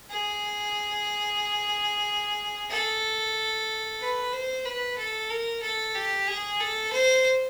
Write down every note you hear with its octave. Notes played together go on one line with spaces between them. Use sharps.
G#4
A4
B4
C5
B4
A4
A#4
A4
G4
G#4
A4
C5